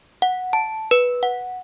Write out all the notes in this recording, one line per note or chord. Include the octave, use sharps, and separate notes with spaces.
F#5
A5
B4
F#5